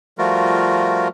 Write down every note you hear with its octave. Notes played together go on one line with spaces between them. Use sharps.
F3 G3 A3 F4 F#4 A#4